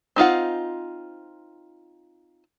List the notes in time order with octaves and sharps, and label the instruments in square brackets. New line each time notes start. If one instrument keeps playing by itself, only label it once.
[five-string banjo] C4 D#4 F4 F#5